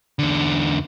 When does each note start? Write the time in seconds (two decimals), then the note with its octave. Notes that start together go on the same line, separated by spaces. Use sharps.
0.19 E2 D3